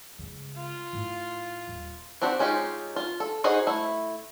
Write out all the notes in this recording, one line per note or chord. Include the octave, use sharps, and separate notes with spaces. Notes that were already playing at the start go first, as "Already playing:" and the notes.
C#3 G#3
F4
A2
D#1
C4 D4 F#4 G4 C5
G#3 C#4 D#4 F4 G4
F4
A4
D#4 F#4 G#4 C5 D#5
A3 E4